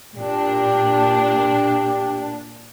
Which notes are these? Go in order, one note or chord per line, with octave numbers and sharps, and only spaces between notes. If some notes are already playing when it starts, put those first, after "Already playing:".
A#2 D4 G4